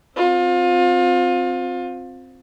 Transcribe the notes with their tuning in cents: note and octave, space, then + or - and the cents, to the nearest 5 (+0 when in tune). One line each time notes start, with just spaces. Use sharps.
C4 +0 F4 +30